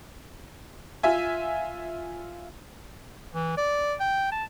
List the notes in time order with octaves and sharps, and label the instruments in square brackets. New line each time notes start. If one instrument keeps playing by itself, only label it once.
[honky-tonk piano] F4 E5 G#5
[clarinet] E3
D5
G5
A5